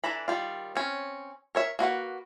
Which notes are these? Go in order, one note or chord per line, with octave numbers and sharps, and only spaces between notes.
E3 D4 A4 A#5 B5
D#3 G3 F4
C4 C#4
A#4 C#5 E5
A#3 F#4 B4 F#5